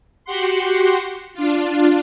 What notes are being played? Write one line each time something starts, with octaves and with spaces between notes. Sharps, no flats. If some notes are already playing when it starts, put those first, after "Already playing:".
F#4 G4 F#5 C6
D4 F4